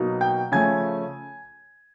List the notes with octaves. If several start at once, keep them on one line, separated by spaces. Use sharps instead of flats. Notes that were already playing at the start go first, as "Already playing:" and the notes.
Already playing: B2 F#3 A#3 D#4
G5 G6
C#3 F3 A3 G#5 G#6